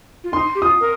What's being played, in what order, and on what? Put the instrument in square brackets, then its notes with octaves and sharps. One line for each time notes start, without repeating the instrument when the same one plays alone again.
[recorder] F4
[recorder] D#4 [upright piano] C6
[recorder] G4
[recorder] F4 [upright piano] D#6
[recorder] A#4